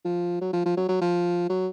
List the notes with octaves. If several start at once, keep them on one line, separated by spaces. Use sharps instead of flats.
F3
F#3
F3
F3
F#3
F#3
F3
F#3